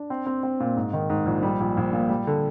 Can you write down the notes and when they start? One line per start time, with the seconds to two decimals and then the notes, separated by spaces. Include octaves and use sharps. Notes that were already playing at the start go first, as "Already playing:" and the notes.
Already playing: D4
0.10 C4
0.26 C4
0.43 C4
0.60 A#2
0.76 G#2
0.93 D#3
1.10 G#2
1.26 A#1
1.43 G3
1.60 A#1
1.77 A#1
1.93 A#2
2.09 G3
2.27 D3